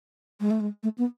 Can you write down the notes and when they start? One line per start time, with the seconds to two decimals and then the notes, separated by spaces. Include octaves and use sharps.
0.40 G#3
0.50 A3
0.60 G#3
0.83 A3
0.98 B3